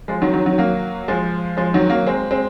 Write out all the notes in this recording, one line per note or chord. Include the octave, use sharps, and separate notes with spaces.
F3 G#3
D#3 F#3
D#3 F#3
D#3 F#3
F#3 A#3
F3 G#3
F3 G#3
D#3 F#3
F#3 A#3
G#3 C4
G#3 C4